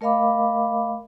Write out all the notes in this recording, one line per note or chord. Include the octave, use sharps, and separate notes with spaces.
A3 A#4 D#5 F5 B5 D6